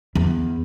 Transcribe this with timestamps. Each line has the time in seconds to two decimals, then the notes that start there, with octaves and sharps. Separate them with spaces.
0.15 E2